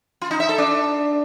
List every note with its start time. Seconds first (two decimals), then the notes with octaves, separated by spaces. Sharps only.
0.22 F4
0.31 D#4
0.40 E5
0.49 A4
0.58 D4